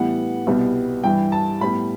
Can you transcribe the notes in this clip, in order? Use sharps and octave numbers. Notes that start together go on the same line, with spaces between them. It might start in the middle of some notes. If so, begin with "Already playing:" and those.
Already playing: A2 E3 G3 B3 F#5
C2 B2 G3 B3
G2 E3 G3 G5
A5
A2 G3 B3 B5